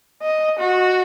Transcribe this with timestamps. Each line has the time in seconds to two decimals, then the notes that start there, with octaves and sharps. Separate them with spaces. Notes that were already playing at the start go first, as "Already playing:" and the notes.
0.23 D#5
0.59 F#4